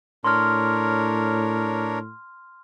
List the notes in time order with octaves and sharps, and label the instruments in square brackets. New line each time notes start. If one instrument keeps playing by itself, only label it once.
[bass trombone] A2 [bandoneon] D4 A#4 C#5 [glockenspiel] C6 F6